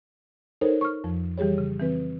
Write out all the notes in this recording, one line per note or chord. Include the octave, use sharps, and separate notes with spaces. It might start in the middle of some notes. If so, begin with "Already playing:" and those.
D#4 A4 A#4 C5 C#5
C#6 F6
F2 F3
E3 G3 G4 G#4 C#5
C#3
E3 C4 B4